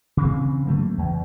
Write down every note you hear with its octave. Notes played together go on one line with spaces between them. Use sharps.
C#3 E3 C4
C#3 F#3 A3 A#3
E2